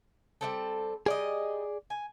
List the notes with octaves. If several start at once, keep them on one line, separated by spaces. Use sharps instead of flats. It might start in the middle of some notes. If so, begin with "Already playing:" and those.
G3 C4 A4
G3 G#4 D5 D#5
G#5